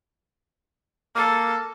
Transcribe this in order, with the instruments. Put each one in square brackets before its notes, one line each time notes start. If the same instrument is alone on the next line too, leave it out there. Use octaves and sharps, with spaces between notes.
[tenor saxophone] A#3 [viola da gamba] A4